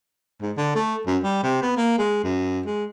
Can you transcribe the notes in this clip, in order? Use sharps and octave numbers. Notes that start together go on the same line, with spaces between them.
G#2
D3
A3
F#2
G3
C3
B3
A#3
G#3
F#2
G#3